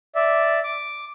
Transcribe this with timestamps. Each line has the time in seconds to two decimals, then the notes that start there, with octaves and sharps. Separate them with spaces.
0.15 D5 E5
0.63 D6